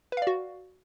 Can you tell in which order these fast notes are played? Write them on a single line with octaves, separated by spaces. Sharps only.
B4 F5 D5 F#4